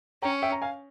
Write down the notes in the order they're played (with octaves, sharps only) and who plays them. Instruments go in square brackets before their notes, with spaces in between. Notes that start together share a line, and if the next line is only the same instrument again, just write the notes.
[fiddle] C#4 [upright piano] G5 A#5
[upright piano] E5 G5
A#5
F5 G#5